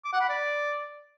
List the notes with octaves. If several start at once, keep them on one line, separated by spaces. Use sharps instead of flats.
D6
F#5
B5
D5